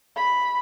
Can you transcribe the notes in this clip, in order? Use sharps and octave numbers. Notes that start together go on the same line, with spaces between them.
B5